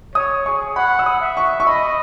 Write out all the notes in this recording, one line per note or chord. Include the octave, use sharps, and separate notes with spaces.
C#5 D#6
G#4 C#6
F#5 B5
E6
D#6
E5
C#6
C#6
D#5 B5